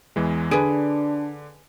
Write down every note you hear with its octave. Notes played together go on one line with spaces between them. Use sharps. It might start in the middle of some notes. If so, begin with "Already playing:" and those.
E2 E3 G#3
D3 D4 G#4 B4 D7